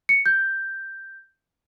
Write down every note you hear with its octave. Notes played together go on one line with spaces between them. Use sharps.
C#7
G6